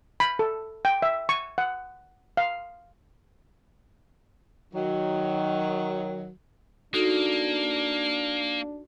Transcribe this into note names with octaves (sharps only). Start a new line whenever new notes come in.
B5
A4
G5
E5
C#6
F#5
F5
D#3 F#3
A#3 D4 D#4 F#4 A4